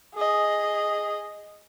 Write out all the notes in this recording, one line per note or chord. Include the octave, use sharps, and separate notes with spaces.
G#4 D#5